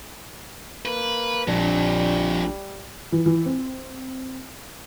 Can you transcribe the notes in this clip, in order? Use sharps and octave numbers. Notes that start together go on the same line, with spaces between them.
A#3 B4
A#1 F2 A#2 G3 D4
E3
E3
C4